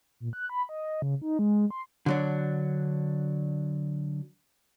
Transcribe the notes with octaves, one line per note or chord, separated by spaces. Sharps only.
A#2
F#6
B5
D#5
C#3
D#4
G#3
C6
D3 F#3 D4